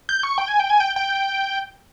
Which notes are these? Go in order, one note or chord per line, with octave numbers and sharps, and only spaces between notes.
G6
C#6
G5
G#5
G5
G#5
G5
G5